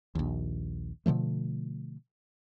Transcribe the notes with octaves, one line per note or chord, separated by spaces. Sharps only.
A#1 D#2
B2 D3 F3 A3